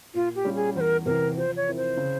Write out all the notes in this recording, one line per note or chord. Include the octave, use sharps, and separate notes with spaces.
A#2 F4
G4
G3 C#4 F4
G#4
E2 C5
A#4
C3 E3 A#4
F3 C5
C#5
C4 E4 A#4
C5
C#3